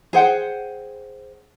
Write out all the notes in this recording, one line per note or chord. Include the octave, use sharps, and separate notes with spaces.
G#4 C5 F#5 G5